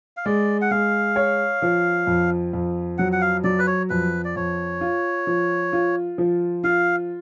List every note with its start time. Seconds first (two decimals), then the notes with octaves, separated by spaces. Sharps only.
0.17 F5
0.26 G#3 D5
0.61 F#5
0.71 G#3 F5
1.16 C#5
1.62 F3
2.07 F2
2.53 F2
2.98 F#3 F#5
3.12 F#5
3.21 F5
3.44 F#3 D5
3.59 B4
3.67 C#5
3.90 F2 B4
4.25 D5
4.36 F2 C#5
4.81 F4
5.27 F3
5.73 F4
6.18 F3
6.64 F4 F5